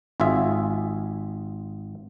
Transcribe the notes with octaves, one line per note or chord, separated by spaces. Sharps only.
G#1 F4 G#4 E5